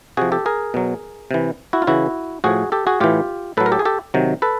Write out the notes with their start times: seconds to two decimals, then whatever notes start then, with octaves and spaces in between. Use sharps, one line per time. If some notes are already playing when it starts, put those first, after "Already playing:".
0.17 C3 F3 F#4 G#4
0.32 G4 A4
0.46 G#4 A#4
0.74 B2 F#3
1.31 C3 E3
1.73 E4 F#4
1.82 F4
1.87 C#3 E3 E4 F#4
2.44 A2 F3 F#4 G#4
2.72 G4 A4
2.87 F#4 G#4
3.00 A2 E3 F4 G4
3.57 A2 F#3 A4 B4
3.66 A#4
3.72 G4 A4
3.79 G#4
3.85 G4 A4
4.14 C3 D#3 F#3
4.42 A4 B4